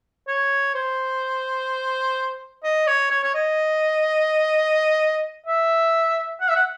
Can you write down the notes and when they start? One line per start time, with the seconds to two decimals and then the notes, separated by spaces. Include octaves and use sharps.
0.28 C#5
0.74 C5
2.64 D#5
2.87 C#5
3.10 C#5
3.23 C#5
3.34 D#5
5.46 E5
6.41 F#5
6.49 E5
6.56 F#5